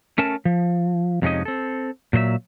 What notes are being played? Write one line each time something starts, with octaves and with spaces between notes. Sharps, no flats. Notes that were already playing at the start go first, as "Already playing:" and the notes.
A3 C#4 A#4 A5
F3
F2 C3 G#3 C#4 D#4 D#5
C4 A4
A#2 F#3 C5 E5